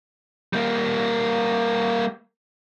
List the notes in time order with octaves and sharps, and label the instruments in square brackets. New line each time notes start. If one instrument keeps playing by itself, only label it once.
[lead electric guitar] G3 A#3